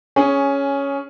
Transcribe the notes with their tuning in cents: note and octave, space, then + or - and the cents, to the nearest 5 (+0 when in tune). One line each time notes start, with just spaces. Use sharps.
C#4 +5 G#4 +0